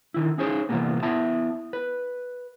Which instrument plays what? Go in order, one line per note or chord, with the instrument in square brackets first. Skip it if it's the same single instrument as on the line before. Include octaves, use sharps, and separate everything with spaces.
[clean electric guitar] D3 D#3 E4
C#4 D#4 G#4 C5 C#5
C3 E3 F3 G3 A#3 B3
B3 E4 E5 A5
B4